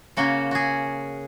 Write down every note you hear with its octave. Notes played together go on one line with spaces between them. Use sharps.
C#3 A#3 C#4 F#4
F#4 G#4